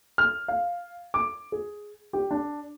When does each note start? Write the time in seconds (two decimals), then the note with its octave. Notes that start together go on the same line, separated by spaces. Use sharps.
0.18 F6
0.48 F5
1.14 D6
1.52 G#4
2.13 G4
2.31 D4